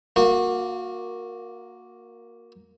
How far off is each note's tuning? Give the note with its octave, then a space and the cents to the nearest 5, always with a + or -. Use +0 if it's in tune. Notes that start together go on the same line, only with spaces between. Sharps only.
A#3 +0 F#4 -25